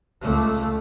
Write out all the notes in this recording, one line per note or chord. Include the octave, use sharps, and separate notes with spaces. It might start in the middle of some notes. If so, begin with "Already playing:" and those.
C#2 A3